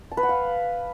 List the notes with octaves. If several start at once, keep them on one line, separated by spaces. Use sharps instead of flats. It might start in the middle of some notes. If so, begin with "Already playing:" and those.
A5
B4
F#5
F5